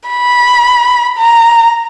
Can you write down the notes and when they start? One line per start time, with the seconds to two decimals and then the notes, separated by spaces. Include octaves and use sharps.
0.09 B5
1.17 A#5